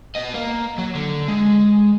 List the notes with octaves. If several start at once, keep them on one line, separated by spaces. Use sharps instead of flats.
B3 D#5
A#3
F#3
D3
G#3